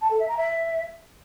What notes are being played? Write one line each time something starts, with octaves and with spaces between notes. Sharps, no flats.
A5
A4
E5
A#5
E5